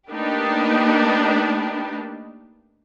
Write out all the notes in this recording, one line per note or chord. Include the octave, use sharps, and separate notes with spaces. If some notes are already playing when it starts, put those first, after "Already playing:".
A3 A#3 D4 D#4 G4 B4